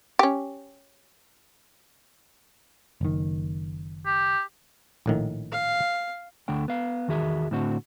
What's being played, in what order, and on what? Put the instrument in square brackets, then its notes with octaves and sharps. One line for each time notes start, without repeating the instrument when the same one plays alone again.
[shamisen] C#4 G4
[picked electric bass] F#1 D#3
[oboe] G4
[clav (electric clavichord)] A#1 A2 D#3
[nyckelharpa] F5
[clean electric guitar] D2 D3 A3 F#5 G5
B3 F5
E2 D#3 F#4 G#4 E5
A2 D3 C4 F#4